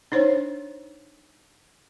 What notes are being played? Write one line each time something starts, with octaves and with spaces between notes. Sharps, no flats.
D4 D#4 C5 C#5